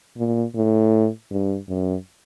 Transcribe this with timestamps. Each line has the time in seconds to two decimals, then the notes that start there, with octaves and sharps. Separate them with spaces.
0.18 A#2
0.56 A2
1.31 G2
1.69 F#2